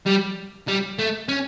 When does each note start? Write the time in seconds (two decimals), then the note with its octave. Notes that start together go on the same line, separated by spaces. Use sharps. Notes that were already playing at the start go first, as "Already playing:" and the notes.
0.06 G3
0.68 G3
0.99 A3
1.28 C#4